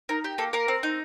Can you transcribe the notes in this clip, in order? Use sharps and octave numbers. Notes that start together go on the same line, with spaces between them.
D#4 A#4
G4
A#3 A4
A#3 A#4
C4
D#4